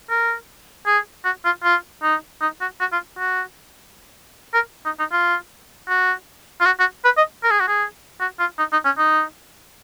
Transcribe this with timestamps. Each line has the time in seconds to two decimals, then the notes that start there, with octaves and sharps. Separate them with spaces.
0.10 A#4
0.86 G#4
1.25 F#4
1.45 F4
1.63 F4
2.03 D#4
2.41 D#4
2.61 F#4
2.80 F#4
2.93 F4
3.18 F#4
4.54 A#4
4.85 D#4
4.99 D#4
5.12 F4
5.88 F#4
6.61 F4
6.66 F#4
6.79 F#4
7.05 B4
7.17 D#5
7.43 A#4
7.51 G#4
7.60 F#4
7.68 G#4
8.20 F#4
8.39 F4
8.58 D#4
8.72 D#4
8.85 C#4
8.98 D#4